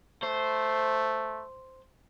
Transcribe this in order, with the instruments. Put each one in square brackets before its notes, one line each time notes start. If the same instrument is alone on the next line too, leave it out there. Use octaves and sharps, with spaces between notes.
[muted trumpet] A3 [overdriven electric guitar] C5